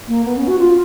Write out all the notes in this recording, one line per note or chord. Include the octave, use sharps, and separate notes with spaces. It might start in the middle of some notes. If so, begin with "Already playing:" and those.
A#3
B3
C#4
F#4
F4